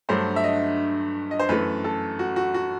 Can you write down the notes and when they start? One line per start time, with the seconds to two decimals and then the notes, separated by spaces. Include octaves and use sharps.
0.09 G2 F#3 A3 C5
0.36 E5
0.44 D#5
1.31 D#5
1.40 C5
1.49 F#2 E3 A3 B4
1.84 A4
2.19 F#4
2.36 F#4
2.54 F#4